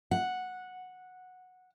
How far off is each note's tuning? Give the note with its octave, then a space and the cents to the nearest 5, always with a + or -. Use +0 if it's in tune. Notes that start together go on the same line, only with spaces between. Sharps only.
F#5 -10